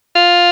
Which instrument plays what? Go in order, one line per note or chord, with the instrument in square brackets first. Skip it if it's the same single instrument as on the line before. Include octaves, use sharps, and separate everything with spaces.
[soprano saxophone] F4